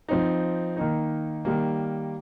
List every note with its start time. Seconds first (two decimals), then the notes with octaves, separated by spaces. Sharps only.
0.08 F3 C4 D#4
0.77 D#3 A#3 D#4
1.45 D#3 G3 A#3